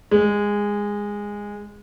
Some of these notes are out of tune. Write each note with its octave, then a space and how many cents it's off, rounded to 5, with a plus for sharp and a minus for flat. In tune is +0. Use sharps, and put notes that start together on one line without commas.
G#3 -15